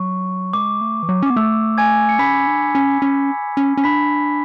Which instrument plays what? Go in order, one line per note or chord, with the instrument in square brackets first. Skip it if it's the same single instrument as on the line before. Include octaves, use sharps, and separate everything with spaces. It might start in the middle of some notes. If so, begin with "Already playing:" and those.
Already playing: [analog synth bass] F#3 [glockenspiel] C#6
[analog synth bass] G#3 [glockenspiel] D6
[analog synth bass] A3
E3
F#3
C#4
[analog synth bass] B3 [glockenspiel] D6
[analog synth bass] A3 [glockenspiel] E6
[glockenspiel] G#5 G#6
C#7
[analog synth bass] C#4 [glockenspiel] B5 B6
[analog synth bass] D4
C#4
C#4
C#4
C#4
[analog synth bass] D4 [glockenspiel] B5 B6